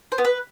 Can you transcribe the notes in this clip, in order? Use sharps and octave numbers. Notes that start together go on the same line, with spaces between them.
C5
B3
B4